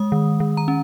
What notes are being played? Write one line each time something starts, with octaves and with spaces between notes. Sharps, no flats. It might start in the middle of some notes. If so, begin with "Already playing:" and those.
Already playing: G#3 D#6
D#3
D#3
A#5
C#4